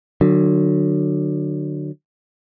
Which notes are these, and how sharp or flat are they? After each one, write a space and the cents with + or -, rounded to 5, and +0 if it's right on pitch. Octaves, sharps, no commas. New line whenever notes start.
D3 +30 F#3 +0